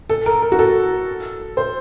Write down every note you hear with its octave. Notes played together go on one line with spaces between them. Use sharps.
A4
A#4
A#4
F#4
A4
C5